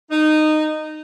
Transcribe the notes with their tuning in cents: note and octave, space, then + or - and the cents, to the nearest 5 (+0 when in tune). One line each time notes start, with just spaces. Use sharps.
D#4 -15